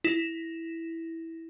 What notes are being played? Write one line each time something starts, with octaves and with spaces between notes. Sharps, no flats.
E4